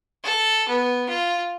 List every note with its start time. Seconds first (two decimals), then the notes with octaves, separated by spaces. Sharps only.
0.24 A4
0.68 B3
1.09 F4